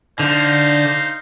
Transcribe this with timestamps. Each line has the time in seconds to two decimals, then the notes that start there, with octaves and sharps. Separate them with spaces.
0.20 D3 D#4 C5 F5